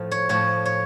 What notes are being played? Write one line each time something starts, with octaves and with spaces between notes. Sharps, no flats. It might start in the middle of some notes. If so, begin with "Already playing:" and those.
Already playing: A2 F3 F5
C#5
A2 F3 C#5
C#5